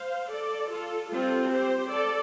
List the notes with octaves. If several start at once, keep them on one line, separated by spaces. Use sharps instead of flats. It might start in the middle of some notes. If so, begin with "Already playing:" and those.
Already playing: C5 F5
A4 D5
F4 A4
G3 C4 F4 A4
G4 C5
A4 D5